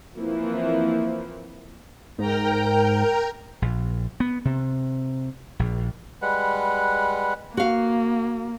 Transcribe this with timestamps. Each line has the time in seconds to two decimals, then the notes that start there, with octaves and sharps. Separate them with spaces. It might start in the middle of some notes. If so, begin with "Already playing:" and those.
0.17 E3 F3 A#3 C4 E4
2.18 G#2 A#4 G5 A#5
3.62 A#1
4.20 B3
4.45 C3
5.59 A#1
6.22 G3 G#3 B4 F#5
7.57 A#3 F#4 F5